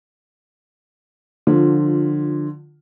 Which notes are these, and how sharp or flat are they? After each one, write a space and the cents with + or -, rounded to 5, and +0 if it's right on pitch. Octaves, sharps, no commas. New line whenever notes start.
D3 +20 F3 +20 F4 +5